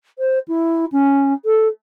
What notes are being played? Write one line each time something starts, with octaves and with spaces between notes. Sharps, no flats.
C5
E4
C#4
A4